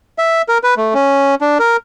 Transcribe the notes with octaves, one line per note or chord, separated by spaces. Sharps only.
E5
A#4
B4
A3
C#4
D4
A#4